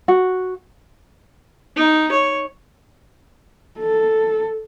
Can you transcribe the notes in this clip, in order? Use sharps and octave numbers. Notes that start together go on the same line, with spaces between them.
F#4
D#4
C#5
A4